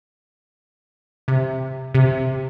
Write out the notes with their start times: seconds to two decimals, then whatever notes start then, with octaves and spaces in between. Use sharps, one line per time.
1.28 C3
1.95 C3